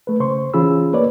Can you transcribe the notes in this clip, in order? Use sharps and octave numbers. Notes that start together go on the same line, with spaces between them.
A3 B4
C#3 C5 C6 C#6
E3 C#4 F4 G#4 B5 E6
A#3 B4 C#5 D5